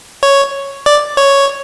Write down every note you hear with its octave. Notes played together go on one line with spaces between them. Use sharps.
C#5
D5
C#5